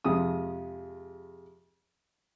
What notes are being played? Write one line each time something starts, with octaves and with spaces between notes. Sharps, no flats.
F2 C3 G#3 D#6